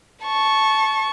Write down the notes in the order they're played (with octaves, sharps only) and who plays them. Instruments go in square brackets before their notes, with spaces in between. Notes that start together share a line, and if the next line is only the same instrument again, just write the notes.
[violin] A5 C#6